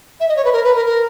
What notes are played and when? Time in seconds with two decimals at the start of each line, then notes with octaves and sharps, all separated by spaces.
0.20 E5
0.29 D#5
0.37 C#5
0.45 B4
0.53 A#4
0.64 B4
0.75 A#4
0.86 A#4